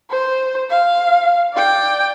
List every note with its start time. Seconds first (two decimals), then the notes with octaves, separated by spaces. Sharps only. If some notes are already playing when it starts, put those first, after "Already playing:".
0.10 C5
0.70 F5
1.53 D5 G5